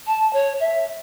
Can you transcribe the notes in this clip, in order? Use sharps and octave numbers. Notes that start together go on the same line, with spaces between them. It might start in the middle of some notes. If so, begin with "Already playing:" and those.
A5
C#5
E5